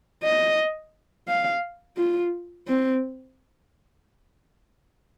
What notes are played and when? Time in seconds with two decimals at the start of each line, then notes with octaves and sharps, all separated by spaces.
0.24 D#5
1.28 F5
1.97 F4
2.68 C4